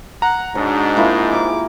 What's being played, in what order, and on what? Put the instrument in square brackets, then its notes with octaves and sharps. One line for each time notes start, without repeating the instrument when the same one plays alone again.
[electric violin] F#5 [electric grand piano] A#5
[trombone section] G#2 [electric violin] D4 F#4 [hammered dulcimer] C#5
[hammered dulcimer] A#3 E4 F4
[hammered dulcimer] G4 G#4 [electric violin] D6